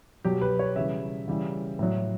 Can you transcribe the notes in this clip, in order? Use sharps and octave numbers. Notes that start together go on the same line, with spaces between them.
B2 F#3 G4
B4
C#5
C#3 E3 G3 E5
C#3 E3 G3
A2 F#3